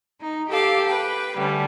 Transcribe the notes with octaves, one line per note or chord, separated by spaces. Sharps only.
D#4
G4 A4 F5 D6
B4 G5
D3 G3 A3 C#4